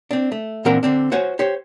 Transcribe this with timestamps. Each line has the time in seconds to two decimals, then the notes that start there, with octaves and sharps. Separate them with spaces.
0.11 C4 D4
0.32 A3
0.65 A#2 E3 C4 D4 A#4 F#5
0.83 D3 C4 D4
1.12 F#4 C5 C#5 G#5
1.39 G4 C5 C#5